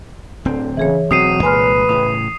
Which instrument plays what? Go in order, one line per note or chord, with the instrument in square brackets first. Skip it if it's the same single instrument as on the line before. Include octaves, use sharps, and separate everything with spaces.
[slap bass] D1 C4 [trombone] D3
[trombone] C#3 [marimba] E3 G#4 C#5
[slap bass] E1 B2 C4 [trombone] F#3 [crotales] D#6 C7 D#7
[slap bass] C2 A#2 G#3 [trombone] B4 [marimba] G#5 C6 F6
[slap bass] A2 C#3 [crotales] D#6